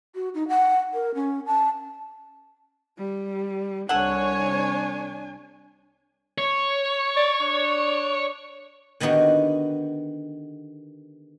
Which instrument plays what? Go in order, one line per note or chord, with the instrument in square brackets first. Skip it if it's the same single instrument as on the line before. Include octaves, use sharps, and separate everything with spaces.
[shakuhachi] F#4
D#4
F#5
A#4
C#4
A5
[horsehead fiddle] G3
[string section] C2 C#5 [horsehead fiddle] D4 G#5 [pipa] A4 F#5
[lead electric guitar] C#5
[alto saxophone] D5
D4
[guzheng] D3 D#3 B3 D#4 F#4 G4